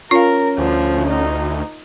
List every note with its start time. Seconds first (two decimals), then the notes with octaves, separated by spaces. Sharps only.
0.11 C#4 F4 A#4 F5
0.58 D2 F3
1.08 D#4